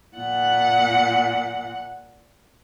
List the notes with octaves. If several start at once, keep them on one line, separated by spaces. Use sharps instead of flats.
A#2 F#5